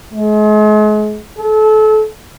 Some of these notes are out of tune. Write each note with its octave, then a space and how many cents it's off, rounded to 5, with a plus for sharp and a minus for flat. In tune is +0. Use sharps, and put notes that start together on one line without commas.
G#3 +40
A4 -30